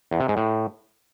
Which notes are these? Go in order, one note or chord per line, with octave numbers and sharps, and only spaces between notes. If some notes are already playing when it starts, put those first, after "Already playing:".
E2
C3
G#2
A2